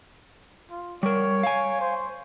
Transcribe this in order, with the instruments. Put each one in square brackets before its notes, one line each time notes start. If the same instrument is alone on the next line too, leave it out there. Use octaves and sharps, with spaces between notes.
[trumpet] F4
[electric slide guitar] G3 A#4 [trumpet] C#5
[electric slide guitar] F5 G#5
[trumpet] C5